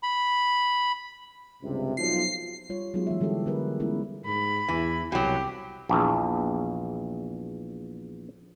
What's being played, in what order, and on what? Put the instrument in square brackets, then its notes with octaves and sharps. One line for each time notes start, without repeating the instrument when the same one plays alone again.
[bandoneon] B5
[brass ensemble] C#2 G2 C3
[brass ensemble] B1 F3 [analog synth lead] C7
[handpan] G3 F4 C#5
F#3 G#3 B3 D#4 F4 G#4
E3 F#3 E5
D3 E3 G3 G#3 G4 A4
D3 G3 B3 G#4 A#4 B4
G#3 A3 B3 C#4 E4 A#4
[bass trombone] G#2 [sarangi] B5
[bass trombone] E2 [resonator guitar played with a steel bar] E3
[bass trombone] C2 [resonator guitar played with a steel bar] B2 F#3 [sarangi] G4
[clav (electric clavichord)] A#1 E2